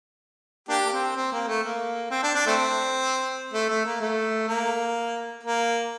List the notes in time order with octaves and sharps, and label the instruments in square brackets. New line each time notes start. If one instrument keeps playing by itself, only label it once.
[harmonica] A#3 D4 G4
A#3
C4
C4
A#3
A3
A#3
C4
D4
D4
A3 C4
A3
A3
A#3
A3
A#3
A#3